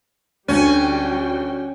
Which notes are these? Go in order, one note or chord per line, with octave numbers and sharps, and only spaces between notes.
D2 G3 C#4 F#4 G5